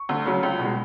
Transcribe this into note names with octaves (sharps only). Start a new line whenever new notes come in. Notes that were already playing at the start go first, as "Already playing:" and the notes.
Already playing: C#6
D2
C#3 F#3
C#2
B2 G#3